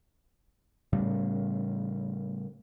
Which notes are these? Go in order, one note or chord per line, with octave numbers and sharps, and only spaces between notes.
A2 C#3 G3